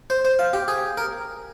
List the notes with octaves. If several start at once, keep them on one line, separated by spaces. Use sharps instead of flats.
C5
C5
F5
G4
G#4
A#4